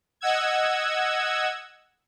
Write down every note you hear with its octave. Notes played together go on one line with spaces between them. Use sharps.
D#5 F#5 E6 G#6